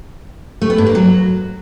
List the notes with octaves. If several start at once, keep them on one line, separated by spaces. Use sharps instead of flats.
A3
B3
G2
A#3
F#3